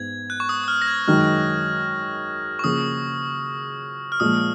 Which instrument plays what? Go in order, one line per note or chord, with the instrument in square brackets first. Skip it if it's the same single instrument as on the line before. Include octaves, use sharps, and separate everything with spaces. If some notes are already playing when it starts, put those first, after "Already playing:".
Already playing: [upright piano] G#2 B3 [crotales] G#6
[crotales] F#6
C#6
D#6
D#6
F6
A#6
G#6
[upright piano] F#2 D#3 G#3 D#4 [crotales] F6
[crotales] C#6
[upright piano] C#3 F3 A#3 C#4 G#4 [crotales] D#6
[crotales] F6
[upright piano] A#2 F3 G#3 [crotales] D#6